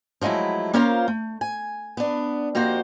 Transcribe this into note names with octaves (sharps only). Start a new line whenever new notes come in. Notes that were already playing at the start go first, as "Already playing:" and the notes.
F3 F#3 G#3 A3 E4
A#3 C#4 F4 A#4 C5 F5
A3
G#5
B3 D4
F2 A#3 F#4 G4 C5